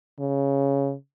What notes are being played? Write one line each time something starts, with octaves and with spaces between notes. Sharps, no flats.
C#3